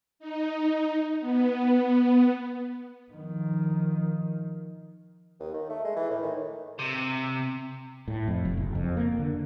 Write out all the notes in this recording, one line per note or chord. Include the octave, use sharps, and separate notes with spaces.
D#4
B3
D#3 F3
D#2
D#3
A3
G#3
E3
A2
D#3
C3
A2
F2
F1
F#1
F2
A#3
D3